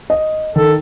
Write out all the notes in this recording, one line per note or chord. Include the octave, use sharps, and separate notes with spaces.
D#5
D#3 A4